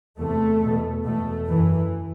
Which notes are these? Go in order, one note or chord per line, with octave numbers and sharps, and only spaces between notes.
E2 C3 A3
E2 B2
E2 B2 A3
F#2 E3